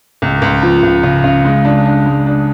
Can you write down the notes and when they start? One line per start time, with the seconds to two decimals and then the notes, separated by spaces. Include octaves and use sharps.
0.22 C#2
0.42 C#2
0.62 F3
0.83 C#2
1.03 C#3
1.24 C#3
1.45 G#3
1.65 D4
1.85 D4
2.06 G#3
2.26 D4